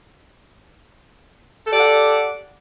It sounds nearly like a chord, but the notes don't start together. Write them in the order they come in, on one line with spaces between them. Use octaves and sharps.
A4 G4 D5 F#5